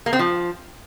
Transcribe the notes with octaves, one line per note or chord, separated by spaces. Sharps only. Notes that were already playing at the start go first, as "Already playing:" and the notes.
A#3
C4
F3